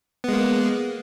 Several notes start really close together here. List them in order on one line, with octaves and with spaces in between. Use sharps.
B3 G#3 A#3